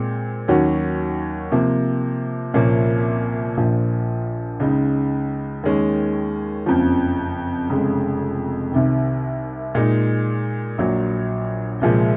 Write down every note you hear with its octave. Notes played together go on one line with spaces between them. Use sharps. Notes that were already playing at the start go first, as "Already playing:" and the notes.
Already playing: A#2 G#3 C4
D#2 D#3 F#3 C#4 F#4
C3 F3 A#3
C2 A#2 F3 A#3 C#4
A#1 A#2 F3
C#2 C#3 G#3 D#4
D#2 D#3 G#3 C#4
F#1 F2 C#3 F3
F1 F2 C#3 G#3
C2 C3 D#3
A#2 G#3 D#4
A#1 A#2 F#3
C2 A#2 F3 G#3